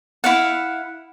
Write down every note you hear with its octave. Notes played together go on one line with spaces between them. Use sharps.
E4 F5 F#5